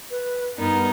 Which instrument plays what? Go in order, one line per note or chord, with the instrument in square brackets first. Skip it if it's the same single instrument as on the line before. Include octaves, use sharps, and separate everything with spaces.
[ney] B4
[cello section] G2 B3 [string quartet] D#4 [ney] A#4